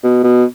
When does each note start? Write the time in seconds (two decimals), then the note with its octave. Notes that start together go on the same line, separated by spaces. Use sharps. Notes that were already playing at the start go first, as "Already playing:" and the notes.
0.03 B2
0.24 B2